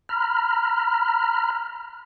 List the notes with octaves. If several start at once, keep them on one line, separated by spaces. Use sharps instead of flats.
A#5 B5 F6